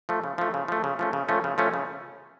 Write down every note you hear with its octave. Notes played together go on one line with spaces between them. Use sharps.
F3 A3
C#3
F3 A3
C#3
F3 A3
C#3
F3 A3 C#4
C#3
F3 A3 C#4
C#3
F3 A3 C#4
C#3